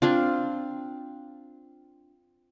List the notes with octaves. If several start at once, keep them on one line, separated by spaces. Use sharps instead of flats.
C4 D4 F4